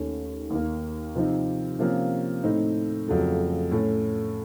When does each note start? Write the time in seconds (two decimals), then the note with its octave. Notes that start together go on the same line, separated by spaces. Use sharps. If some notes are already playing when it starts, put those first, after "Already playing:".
Already playing: D#2 D#3 A3 C#4
0.50 D#2 D#3 A#3
1.15 C3 F3 C4 D#4
1.79 C3 F3 A#3 C#4
2.43 A2 A3 C4 D#4
3.08 F2 C#3 F#3 A3
3.71 A2 A3 C#4